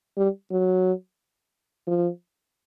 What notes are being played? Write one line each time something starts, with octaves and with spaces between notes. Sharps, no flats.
G3
F#3
F3